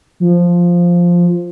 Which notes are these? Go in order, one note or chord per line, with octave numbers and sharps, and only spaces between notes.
F3